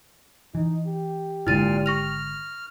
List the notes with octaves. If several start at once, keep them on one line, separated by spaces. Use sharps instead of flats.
E3 D#4
G4
G#1 A#2 D3 G#3 E4 F6 A6 D#7
C#6 F6 A#6 F7